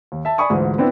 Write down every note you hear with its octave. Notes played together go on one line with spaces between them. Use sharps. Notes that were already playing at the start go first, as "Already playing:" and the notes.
D#2
E5 A5
D5 G#5 B5 C#6 D#6
D2 G#2 E3 F4
B3 C4 D4 E4 B4